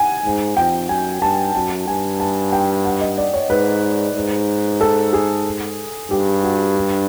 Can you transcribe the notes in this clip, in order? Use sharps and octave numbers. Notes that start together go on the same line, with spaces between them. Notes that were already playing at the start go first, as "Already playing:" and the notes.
Already playing: F#5 G#5
G#2
F2 G5
F#2 G#5
G2 A5
F#2 A5
G2 G#5
A5
G5
F#5
D#5
D5
C#5
G#2 B4
G#2
A4
G#4
G2 G4
F#4
D4